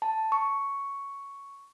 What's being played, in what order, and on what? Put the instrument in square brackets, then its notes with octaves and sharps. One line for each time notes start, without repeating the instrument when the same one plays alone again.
[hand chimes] A5
C#6